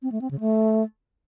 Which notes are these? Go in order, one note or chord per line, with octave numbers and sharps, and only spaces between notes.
C4
A3
C4
C#3
A3